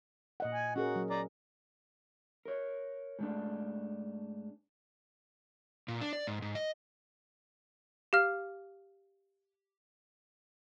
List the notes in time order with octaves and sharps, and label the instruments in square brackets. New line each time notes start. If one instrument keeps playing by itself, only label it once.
[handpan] A#2 D#5 F#5
[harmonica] G#5
[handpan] C#4 G#4 A#4 [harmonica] F#4
[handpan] F#3
[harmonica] D5 A#5
[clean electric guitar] A#4 C#5
G#2 A3 D4
[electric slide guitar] A#2
D4
D5
G#2
G#2
D#5
[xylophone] G4 F5 F6